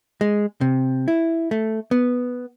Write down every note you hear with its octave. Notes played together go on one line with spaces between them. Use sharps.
G#3
C3
E4
A3
B3